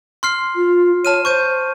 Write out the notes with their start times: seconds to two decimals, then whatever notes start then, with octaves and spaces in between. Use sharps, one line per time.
0.23 C6 F6 C7
0.55 F4
1.05 C#5 A5 F6 D#7
1.25 C5 C#6 G6 D#7